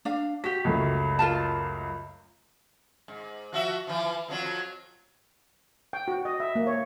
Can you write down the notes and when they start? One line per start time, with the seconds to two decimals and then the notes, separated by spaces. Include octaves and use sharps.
0.05 D4 F5
0.44 F#4 G4 B6
0.65 C#2 F#2 A3
1.19 F4 A#4 A5
3.08 G#2
3.53 F3 F#4 E5
3.87 E3 F3
4.28 F2 F3 F#3
5.93 G5
6.08 F#4
6.25 D#5
6.40 E5
6.55 A#3
6.67 C#5